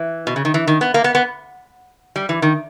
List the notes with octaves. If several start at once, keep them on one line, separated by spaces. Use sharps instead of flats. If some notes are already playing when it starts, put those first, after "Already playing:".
Already playing: E3
B2
C#3
D#3
E3
D#3
B3
A#3
B3
B3
G3
E3
D#3